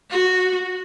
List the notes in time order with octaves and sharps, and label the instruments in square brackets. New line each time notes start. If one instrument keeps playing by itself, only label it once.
[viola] F#4